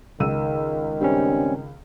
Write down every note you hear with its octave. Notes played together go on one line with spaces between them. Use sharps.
C#2 D#3 E6 D#7
G2 G3 C4 C#4